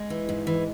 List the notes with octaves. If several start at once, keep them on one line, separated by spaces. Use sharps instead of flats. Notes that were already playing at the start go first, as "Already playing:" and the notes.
Already playing: G#3
E3
G#2
E3